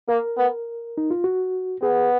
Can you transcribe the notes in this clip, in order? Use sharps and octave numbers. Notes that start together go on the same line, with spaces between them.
A#3 A#4
B3
D#4
F4
F#4
B3 G#4